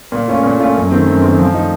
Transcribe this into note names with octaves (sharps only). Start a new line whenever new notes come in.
A#2
A3 C#4 F4
A#2
A3 C#4 F4
F#2
D#3 A3 C4
F#2
D#3 A3 C4
F3
A3 D#4